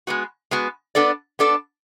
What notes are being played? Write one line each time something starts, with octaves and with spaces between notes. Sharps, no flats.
G#3 B3 F#4
G#3 B3 F#4
B3 D4 A4 D5
B3 D4 A4 D5